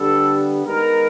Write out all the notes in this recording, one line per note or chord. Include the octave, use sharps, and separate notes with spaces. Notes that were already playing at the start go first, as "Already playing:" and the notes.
Already playing: D3 G3 B3 A4
D#3 G#3 B3 A#4